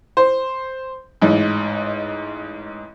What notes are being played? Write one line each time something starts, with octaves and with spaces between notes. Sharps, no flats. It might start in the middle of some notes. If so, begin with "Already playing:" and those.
C5
A1 G#2